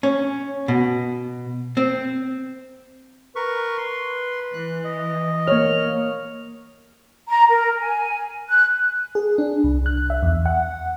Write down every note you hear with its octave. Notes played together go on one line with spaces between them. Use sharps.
C#4
B2
C4
A#4 B4 C#6
C6
E3 F#6
D#5
A#3 C#5 F6
A#5
A#4
G#5
F#6
G#4
D4
C2
F#6
E5
E2
F#5